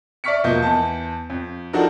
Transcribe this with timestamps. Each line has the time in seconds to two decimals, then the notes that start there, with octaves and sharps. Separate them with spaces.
0.24 D5 E5 C#6 F6 B6 C#7
0.44 E1 B2 F3 A#3 D#5 G6
0.62 E2 A5
1.30 F2
1.73 F3 D4 D#4 F#4 A4 A#4